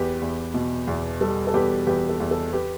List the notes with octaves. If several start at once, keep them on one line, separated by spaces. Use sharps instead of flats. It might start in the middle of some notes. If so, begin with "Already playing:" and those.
Already playing: E2 G4 B4
E2
B2
E2
G3 A4
A4
E2 G4 B4
E2 G4 B4
A4
E2
A4
G4 B4